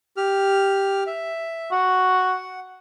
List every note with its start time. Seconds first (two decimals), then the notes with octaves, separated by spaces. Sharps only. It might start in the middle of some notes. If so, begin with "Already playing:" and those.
0.17 G4 F6
1.07 E5
1.72 F#4 F#5